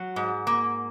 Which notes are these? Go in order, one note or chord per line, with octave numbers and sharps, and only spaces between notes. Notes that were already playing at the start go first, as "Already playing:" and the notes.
Already playing: F#3 F#4
G#2
A#3